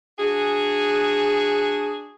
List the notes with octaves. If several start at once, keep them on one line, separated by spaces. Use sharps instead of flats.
D4 F#4 G#4